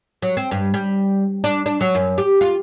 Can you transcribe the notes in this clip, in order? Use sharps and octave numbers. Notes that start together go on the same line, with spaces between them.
F#3
C4
G2
G3
D4
D4
F#3
F#2
G4
F4